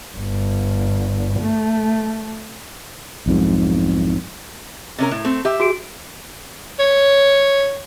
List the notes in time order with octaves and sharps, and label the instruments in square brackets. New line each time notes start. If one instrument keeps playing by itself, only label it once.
[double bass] G1
A3
[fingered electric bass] B1 F2 G#2
[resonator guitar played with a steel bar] C3 C#4 A#4
A2
A3 C4
G4 E5
[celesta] F#4 G#4 D7
[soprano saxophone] C#5